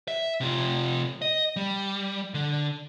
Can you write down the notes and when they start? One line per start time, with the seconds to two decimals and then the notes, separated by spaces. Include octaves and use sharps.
0.08 E5
0.40 C3 F4
1.22 D#5
1.56 G3
2.34 D3